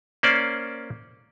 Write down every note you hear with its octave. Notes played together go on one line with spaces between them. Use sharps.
A#3 C#4 C5 D5